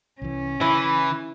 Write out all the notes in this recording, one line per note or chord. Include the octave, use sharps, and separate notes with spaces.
C2 E3 C#4
C#3 E3 E4